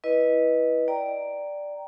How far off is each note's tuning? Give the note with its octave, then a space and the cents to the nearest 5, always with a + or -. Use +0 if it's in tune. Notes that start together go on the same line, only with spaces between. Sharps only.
E4 +0 B4 -15 D#5 +0
D5 +0 G5 -10 A#5 +0